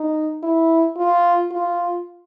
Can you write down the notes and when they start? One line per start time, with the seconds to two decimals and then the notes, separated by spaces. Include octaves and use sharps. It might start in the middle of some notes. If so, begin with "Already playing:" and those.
Already playing: D#4
0.43 E4
0.98 F4
1.51 F4